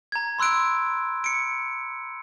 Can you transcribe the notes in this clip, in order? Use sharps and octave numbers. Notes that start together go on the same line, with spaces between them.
A#5 G#6
B5 C6 E6 F#6 D7
C#7 D7